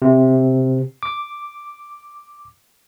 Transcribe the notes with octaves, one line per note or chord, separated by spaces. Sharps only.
C3
D6